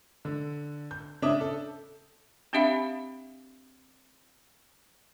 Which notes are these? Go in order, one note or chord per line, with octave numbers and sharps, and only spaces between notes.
D3
G6
C#3 D4 E5 D6 D#6
A4
C4 D4 G4 E5 F5 B5